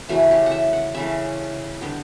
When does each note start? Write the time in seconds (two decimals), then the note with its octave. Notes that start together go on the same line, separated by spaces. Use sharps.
0.09 C#3 E3 A3 F#4
0.31 G4
0.46 F#5
0.52 E5
0.73 F#5
0.95 C#3 E3 A3 E5
1.81 D3 G3 B3 G5